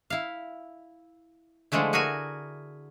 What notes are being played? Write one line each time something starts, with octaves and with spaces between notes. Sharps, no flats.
E4 F5
D3 F3 G#3 A3 E4
F#4 G#4 A#4 E5 G#5